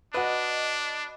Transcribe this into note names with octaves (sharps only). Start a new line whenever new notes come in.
D4 F#4 B4 D#5